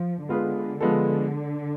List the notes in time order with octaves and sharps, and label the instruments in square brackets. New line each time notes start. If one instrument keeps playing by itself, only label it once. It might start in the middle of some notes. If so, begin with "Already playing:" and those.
Already playing: [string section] F3
[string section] D3 [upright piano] G#3 B3 F4 G#4 B4
[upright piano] F3 G#3 B3 F4 A4